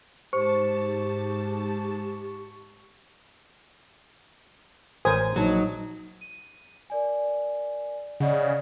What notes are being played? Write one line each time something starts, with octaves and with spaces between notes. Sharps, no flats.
G#2 G4 C5 A5 C#6
A1 A#4 C5 G#5 D#6
A#1 F#3 D#4 A5
D#7
A#4 D5 G#5
C#3 D5 D#5 F#5